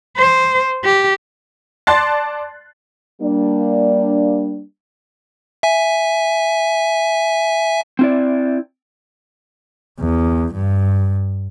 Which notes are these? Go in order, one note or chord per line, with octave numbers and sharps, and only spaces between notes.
C5
G4
D5 A5 C6 F#6 A6 C7
G3 A#3 D4
E5 G#5
C4 E4 D5
E2
G2